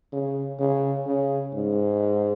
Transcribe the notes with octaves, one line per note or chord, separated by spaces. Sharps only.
C#3
C#3
C#3
G#2